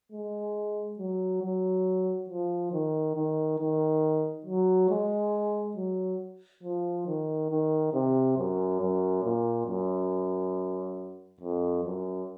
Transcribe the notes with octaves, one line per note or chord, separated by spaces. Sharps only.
G#3
F#3
F#3
F3
D#3
D#3
D#3
F#3
G#3
F#3
F3
D#3
D#3
C3
F#2
F#2
A#2
F#2
F2
F#2